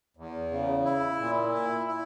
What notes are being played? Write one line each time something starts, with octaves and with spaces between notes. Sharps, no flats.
E2
C#3
E4
A#2
E4
E4